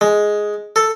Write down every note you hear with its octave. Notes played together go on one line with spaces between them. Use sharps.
G#3
A4